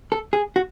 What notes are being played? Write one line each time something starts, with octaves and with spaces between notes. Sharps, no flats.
A4
G#4
F#4